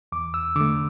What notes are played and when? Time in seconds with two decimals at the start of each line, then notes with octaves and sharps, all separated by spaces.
0.12 E2 D6
0.34 E6
0.56 D3 A3 D6